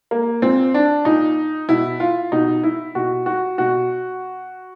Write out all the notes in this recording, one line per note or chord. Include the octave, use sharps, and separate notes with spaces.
A#3
A#2 C4
D4
A#2 D#4
B2 E4
F4
B2 D#4
E4
B2 F#4
F#4
B2 F#4